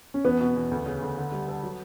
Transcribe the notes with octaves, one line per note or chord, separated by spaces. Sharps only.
C#4
E2 B3
B2
E2
D2
C#3
D2
D3
G3
A4
F#3